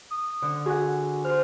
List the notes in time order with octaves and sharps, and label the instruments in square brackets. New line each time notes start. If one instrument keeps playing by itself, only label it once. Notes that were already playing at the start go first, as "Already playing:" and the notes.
[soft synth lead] D#6
[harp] D3
[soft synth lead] F#4 [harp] G#4 F#5
[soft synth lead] C5 [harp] C6 F6